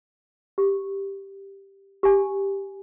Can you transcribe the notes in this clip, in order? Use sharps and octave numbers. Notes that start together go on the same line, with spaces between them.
G4
G4 G#5